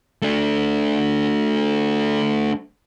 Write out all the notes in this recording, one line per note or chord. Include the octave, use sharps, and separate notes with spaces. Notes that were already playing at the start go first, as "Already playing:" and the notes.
A3 D4